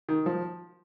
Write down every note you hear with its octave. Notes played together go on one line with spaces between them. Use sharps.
D#3
F3